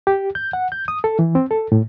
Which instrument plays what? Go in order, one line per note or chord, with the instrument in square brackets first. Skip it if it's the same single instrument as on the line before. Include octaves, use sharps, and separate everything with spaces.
[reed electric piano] G4
G6
F#5
G6
D#6
A4
E3
C4
A4
A2